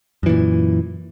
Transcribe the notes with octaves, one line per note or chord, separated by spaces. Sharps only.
F#2 A#2 E3